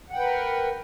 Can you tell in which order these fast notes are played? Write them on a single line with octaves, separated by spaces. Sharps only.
F#5 G5 B4 A#4